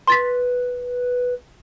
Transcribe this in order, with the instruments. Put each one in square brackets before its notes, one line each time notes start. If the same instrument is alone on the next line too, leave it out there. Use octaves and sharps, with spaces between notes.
[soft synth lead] B4 [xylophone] C6 A6 B6